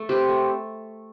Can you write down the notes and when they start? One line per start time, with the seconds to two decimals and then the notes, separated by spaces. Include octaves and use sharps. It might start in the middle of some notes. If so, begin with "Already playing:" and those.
Already playing: A3
0.09 C4 G4 B4
0.29 A3